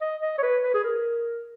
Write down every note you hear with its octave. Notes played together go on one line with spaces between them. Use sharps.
D#5
D#5
C#5
B4
B4
G#4
A#4